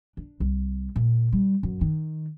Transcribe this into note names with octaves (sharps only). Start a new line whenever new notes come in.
D4
C2
A#2
G3
F#2
D#3